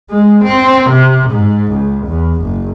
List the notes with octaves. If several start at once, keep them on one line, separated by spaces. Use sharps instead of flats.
G#3
C4
C3
G#2
C#2
E2
F#1